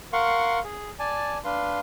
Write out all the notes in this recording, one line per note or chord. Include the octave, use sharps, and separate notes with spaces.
A#4 F5 F#5 C6 C#6
G#4
D5 G#5 A5
D4 B4 F5 C6